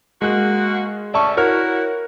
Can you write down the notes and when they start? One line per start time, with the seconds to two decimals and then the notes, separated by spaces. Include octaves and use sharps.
0.22 G#3 A#3 F#4 F#6
1.14 D2 C#4 D5 E5 A5 C#6
1.37 E4 F#4 A#4 C#5 F6